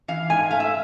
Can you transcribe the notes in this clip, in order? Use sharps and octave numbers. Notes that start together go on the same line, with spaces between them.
E3 F5
G#2 G#5
A3 F5
E5